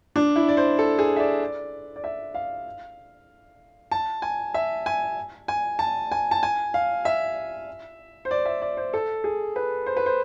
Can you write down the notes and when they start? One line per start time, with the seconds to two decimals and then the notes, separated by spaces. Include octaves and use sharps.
0.16 D4
0.36 E4
0.49 D5
0.57 C5
0.79 A4
0.99 G#4
1.16 E5
1.20 D5
1.96 D5
2.04 E5
2.34 F5
3.92 A5
4.22 G#5
4.54 E5
4.86 G#5
5.48 G#5
5.79 A5
6.11 G#5
6.31 A5
6.43 G#5
6.74 F5
7.05 E5
8.25 C5
8.31 D5
8.46 E5
8.62 D5
8.77 C5
8.94 A4
9.24 G#4
9.56 B4
9.86 C5
9.97 B4
10.06 C5